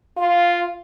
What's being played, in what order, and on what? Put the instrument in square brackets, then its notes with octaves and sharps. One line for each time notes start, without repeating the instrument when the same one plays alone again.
[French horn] F4 [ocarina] F5